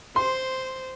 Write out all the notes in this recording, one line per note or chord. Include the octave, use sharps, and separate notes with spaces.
C5 C6